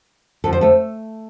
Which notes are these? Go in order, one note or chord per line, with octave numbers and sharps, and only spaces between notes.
F2 D3 F3 A4
C5
A3 A4